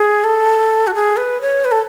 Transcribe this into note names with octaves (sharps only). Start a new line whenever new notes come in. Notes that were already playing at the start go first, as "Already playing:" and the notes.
Already playing: G#4
A4
F#4
G#4
B4
C#5
B4
A4